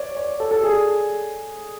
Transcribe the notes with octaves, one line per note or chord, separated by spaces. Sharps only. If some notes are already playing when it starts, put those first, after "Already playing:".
Already playing: C#5 D5
C#5
A4
A4
G#4